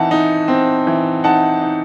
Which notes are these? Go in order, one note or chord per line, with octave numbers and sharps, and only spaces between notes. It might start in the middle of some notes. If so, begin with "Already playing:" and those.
Already playing: E3 C4 D#4 F#5 A5
D#4
C4
E3
D#4 F#5 A5
D#4